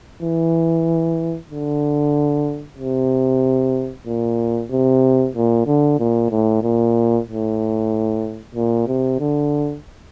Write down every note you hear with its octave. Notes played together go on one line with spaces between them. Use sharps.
E3
D3
C3
A#2
C3
A#2
D3
A#2
A2
A#2
A2
A#2
C3
D3